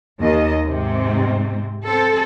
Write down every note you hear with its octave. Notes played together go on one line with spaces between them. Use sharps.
D#2 D#5
G#2 C3 C4
C4 A4